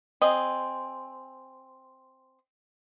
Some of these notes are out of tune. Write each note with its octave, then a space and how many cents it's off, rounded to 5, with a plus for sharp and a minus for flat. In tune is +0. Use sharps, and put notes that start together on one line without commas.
C4 +0 G#4 +0 D#5 -15